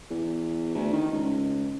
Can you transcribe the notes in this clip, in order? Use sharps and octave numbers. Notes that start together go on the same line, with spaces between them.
E2
D2
D#3
C#2